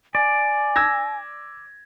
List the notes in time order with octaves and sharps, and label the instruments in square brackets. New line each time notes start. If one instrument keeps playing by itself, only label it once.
[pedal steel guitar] D5 [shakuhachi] G#5
[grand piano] E6 G#6 A#6